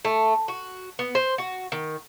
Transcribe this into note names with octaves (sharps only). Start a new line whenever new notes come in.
A3
F#4
B3
C5
F#4
D#3